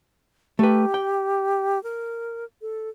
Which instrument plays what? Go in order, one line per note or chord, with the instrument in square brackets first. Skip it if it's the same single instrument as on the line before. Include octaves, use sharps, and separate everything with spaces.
[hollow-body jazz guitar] A3 B4 [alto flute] G4
[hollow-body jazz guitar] G5
[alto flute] A#4
A4